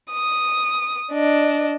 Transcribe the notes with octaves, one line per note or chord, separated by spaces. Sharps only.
D#6
D4 D#5